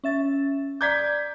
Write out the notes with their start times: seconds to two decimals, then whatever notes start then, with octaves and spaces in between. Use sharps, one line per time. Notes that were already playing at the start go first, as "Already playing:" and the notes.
0.04 C#4 E5 A6
0.81 D5 A#5 D6 G6 G#6 B6